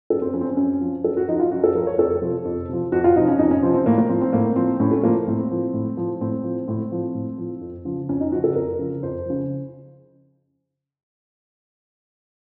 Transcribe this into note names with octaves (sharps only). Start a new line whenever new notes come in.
F#2 A4
C4
F3 C#4
C4
C#4
F#2 C#4
F3
F#2 A4
F#4
F3 D#4
F4
F#2 F#4
A4
F3 A#4
C#5
F2 A4
C3 F3
F2
C3 F3
F2 F#4
F4
C3 F3 D#4
C#4
F2 D#4
C#4
C3 F3 C4
C4
A2 A#3
A#3
F3 C4
C4
A2 A#3
F3 C4
A2 C#4
A3
F3 A#3
A2 C4
F3
A2
F3
A2 C4
F3
A2 C4
F3
A2
F3
F2
C#3 F3
F2 C#4
D#4
C#3 F3 F#4
A4
F2 A#4
C#3 F3
F2 C5
C#3 F3